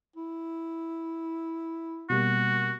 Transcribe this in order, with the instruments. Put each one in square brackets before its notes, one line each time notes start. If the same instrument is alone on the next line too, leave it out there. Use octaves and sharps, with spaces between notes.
[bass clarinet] E4
[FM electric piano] B2 G3 A#3 [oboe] F#4